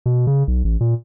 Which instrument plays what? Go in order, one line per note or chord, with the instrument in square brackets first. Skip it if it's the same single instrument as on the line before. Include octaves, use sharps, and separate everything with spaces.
[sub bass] B2
C#3
B1
A1
A#2